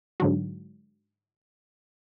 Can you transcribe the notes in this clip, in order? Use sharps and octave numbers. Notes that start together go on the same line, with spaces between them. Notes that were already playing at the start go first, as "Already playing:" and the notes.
G#2 D3 F#3